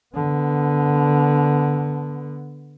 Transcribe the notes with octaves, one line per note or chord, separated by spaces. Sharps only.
D3 B3